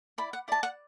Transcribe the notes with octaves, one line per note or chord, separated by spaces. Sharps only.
E4 D5 B5
F#5
E4 D5 A5
F#5